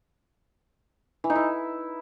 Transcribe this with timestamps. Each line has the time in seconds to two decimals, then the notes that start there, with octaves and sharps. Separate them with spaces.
1.24 E3
1.30 D#4
1.35 E4